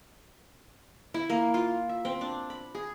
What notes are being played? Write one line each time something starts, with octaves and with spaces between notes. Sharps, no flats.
E4
A#3
F4
E5
C4
D4
B5
G#4